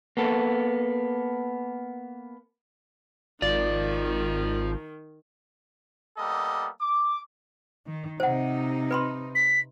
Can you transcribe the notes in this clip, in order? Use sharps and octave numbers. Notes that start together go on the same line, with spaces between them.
A#3 B3 A4
G#1 D#3 F3 F4 D5
G3 A#3 B3 A4 D#5
D6
D#3
C3 D#4 C5 F#5
B4 B5 C6
B6